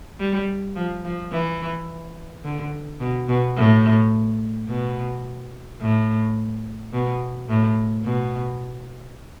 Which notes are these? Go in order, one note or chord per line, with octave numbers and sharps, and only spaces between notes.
G3
F3
F3
E3
D3
B2
B2
A2
B2
A2
B2
A2
B2